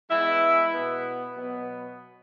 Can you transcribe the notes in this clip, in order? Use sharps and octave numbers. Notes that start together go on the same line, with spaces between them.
E3 G#3 B3 E4
B2 B3
B2 F#3 B3